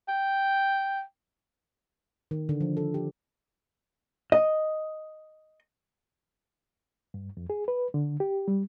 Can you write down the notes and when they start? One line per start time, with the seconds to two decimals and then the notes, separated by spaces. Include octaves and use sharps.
0.08 G5
2.31 D#3
2.49 D3
2.61 F3
2.77 A4
2.94 G4
4.32 D#5
7.14 G2
7.37 F2
7.50 G#4
7.68 B4
7.94 D3
8.20 G4
8.48 G3